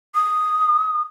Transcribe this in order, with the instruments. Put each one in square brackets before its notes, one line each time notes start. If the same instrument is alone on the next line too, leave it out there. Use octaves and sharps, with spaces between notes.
[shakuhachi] D#6